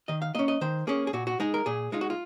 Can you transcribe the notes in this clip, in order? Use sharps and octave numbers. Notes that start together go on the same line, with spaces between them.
D#3 D#5
F5
A#3 C#4 D#5
D#5
D#3 C5
A#3 C#4 G#4
G#4
A#2 F#4
F#4
G#3 D#4 G#4
A#4
A#2 G#4
G#3 D#4 F4
F#4
F4